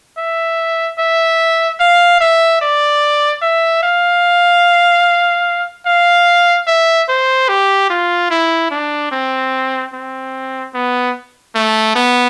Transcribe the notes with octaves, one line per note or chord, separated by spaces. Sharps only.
E5
E5
F5
E5
D5
E5
F5
F5
E5
C5
G4
F4
E4
D4
C4
C4
B3
A3
B3